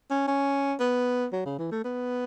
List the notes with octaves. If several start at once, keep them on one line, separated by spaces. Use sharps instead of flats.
C#4
C#4
B3
F#3
C#3
E3
A3
B3